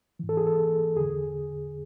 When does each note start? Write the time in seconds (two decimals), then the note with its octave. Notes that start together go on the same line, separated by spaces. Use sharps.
0.19 G#2 E3
0.29 A4
0.37 G#4
0.47 A4
0.96 E2 D3 G#4